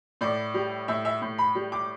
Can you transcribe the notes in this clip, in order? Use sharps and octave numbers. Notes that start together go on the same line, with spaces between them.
A2 D5
G3
A2 E5
E5
A2
B5
G3
D6